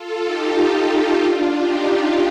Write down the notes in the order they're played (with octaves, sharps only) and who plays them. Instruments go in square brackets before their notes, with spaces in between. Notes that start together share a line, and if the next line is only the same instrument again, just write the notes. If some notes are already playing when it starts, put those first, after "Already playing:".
Already playing: [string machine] F4 A4
D#4 G4
F4 A4
D4 F4
D#4 G4
D#4 G4